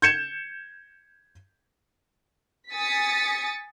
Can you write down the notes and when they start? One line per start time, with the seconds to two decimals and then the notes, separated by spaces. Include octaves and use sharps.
0.02 G6 G#6 C#7 E7
2.72 G#5 D#6 A6 B6 C#7